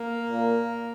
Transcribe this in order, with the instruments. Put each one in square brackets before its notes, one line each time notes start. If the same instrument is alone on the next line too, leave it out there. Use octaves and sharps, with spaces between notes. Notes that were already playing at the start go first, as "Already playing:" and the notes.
Already playing: [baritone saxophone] A#3
[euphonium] A#2